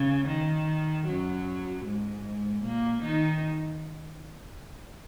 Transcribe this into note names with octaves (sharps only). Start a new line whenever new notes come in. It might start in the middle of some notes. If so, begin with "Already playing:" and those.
Already playing: C#3
D#3
F#2 F#3
G#2 G#3
A#2 A#3
D#3 D#4